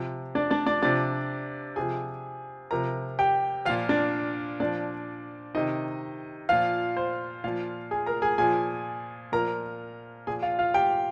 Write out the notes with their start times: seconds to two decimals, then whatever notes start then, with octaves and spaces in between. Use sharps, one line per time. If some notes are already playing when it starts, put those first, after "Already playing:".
Already playing: C3 F3
0.35 D4 D5
0.51 D4 D5
0.66 D4 D5
0.82 C3 F3 D4 D5
1.76 C3 F3 G#4 G#5
2.71 C3 F3 A#4 A#5
3.19 G4 G5
3.65 F3 F4 F5
3.70 A#2
3.89 D4 D5
4.60 A#2 F3 D4 D5
5.55 C3 D#3 D#4 D#5
6.49 A#2 F3 F4 F5
6.97 C5
7.44 A#2 F3 F4 F5
7.91 G#4 G#5
8.06 A#4 A#5
8.22 G#4 G#5
8.38 A#2 F3 G#4 G#5
9.32 A#2 F3 A#4 A#5
10.27 A#2 F3 G#4 G#5
10.43 F4 F5
10.59 F4 F5
10.74 G4 G5